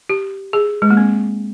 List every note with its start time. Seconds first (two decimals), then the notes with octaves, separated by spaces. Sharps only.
0.09 G4
0.53 G#4
0.82 G#3
0.90 A#3
0.97 C4